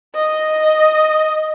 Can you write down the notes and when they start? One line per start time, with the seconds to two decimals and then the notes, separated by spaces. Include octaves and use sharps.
0.15 D#5